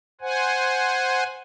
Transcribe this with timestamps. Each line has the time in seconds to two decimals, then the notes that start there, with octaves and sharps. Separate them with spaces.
0.21 C5 F#5 G#5